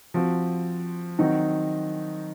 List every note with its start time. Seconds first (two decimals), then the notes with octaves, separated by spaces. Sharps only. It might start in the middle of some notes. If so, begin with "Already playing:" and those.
0.14 F3 C4 F#4
1.19 D#3 F#3 C4 D#4 F#4